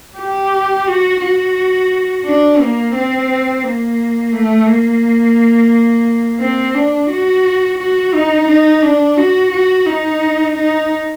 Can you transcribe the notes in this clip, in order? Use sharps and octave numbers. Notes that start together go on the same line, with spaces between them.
G4
F#4
F#4
D4
A#3
C4
A#3
A3
A#3
C4
D4
F#4
F#4
D#4
D#4
D4
F#4
F#4
D#4
D#4